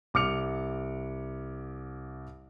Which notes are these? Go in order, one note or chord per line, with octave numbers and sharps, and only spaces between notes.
C2 D6 F6 C#7 F7